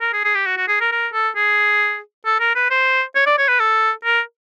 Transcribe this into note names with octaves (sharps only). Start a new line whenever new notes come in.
A#4
G#4
G#4
G4
F#4
F#4
G#4
A#4
A#4
A4
G#4
A4
A#4
B4
C5
C#5
D5
C#5
B4
A4
A#4